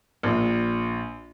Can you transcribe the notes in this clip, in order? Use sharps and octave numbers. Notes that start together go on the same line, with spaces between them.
A#1